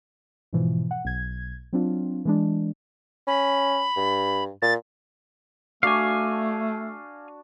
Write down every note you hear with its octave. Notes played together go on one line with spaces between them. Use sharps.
G#2 B2 E3 F3
F#5
B1 G#6
F#3 C4 D4 F4
E3 G#3 D4
C#4 B5
G2
A#2 A6
A3 D4 F#4 D5 F5 G#5